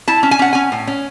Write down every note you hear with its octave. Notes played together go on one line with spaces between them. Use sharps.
E4 A5
C#4
G#5
C#4 F#5
C#4 G#5
A2
C#4